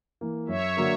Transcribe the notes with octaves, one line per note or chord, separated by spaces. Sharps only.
E3 A#3
F#2 C#5 E5
D3 F#3 A#3